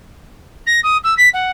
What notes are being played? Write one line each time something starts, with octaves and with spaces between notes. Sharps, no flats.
A#6
D#6
E6
B6
F#5